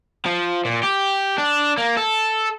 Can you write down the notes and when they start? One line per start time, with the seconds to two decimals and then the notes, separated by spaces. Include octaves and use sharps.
0.26 F3
0.65 A#2
0.83 G4
1.38 D4
1.78 A#3
1.97 A4